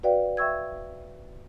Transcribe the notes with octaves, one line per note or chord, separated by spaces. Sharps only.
F#4 B4 D5 F5 G5
E5 G5 C#6 E6 G#6